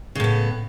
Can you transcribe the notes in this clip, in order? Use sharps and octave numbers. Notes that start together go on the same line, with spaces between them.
A2 C#3 B3